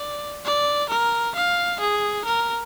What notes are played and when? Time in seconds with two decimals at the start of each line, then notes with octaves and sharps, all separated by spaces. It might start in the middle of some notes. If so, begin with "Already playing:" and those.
Already playing: D5
0.45 D5
0.90 A#4
1.36 F5
1.80 G#4
2.25 A#4